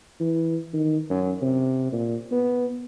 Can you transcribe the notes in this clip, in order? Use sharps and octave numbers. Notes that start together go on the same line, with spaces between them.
E3
D#3
F#2
C3
A#2
B3